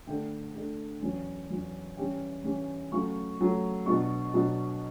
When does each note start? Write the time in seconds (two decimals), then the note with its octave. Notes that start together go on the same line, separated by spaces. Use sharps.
0.07 D3 A3 D4 G5
0.54 D3 A3 D4
1.02 E2 C#3 F#3 C#4
1.50 E2 C#3 F#3 C#4
1.97 C#3 E3 G3 C#4 G5
2.44 C#3 E3 G3 C#4
2.92 C#3 F#3 A3 C#6
3.39 C#3 F#3 A3
3.86 B2 F#3 B3 D4 C#6
4.34 B2 F#3 B3 D4